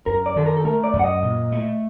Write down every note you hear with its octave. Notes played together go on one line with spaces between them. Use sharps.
F#2 A#4
D5
D#3 A4
A#4
A4
A3 A#4
D5
F#2
F#5
D#5
A#2
A3